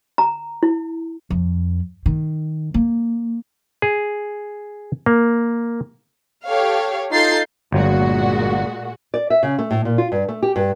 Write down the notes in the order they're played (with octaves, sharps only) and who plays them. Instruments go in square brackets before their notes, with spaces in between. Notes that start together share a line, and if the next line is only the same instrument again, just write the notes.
[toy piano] A#5
E4
[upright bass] F2
D#3
A#3
[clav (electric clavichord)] G#4
A#3
[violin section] G4 A4 C#5 F5
D#4 F4 A4 G6 A6 C7
[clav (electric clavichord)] G1 F#3 [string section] A#2 G#3 F#4
[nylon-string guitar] D5
E5
C#3
A3
A2
A#2
F4
G2
A3
G4
G2